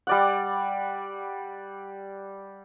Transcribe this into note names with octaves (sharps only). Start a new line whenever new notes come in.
G3 D5 F#5